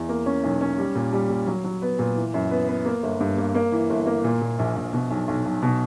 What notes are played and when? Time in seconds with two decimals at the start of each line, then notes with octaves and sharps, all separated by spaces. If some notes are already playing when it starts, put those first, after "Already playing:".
Already playing: E2
0.09 A#3
0.26 C#4
0.43 B1
0.61 C#4
0.78 G3
0.95 A#2
1.12 G3
1.30 A#2
1.47 F#3
1.64 F#3
1.82 B3
1.99 A#2
2.16 E3
2.34 F#2
2.51 B3
2.68 B3
2.85 A#3
3.03 G1
3.20 G2
3.38 A#3
3.55 A#3
3.72 E3
3.89 G1
4.06 A#3
4.24 A#2
4.41 A#2
4.59 A#1
4.76 A#1
4.93 B2
5.10 B1
5.28 B1
5.45 B1
5.62 B2